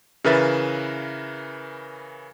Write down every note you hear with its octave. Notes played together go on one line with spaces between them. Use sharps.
C#3 E3 A#4 B4 E5 A6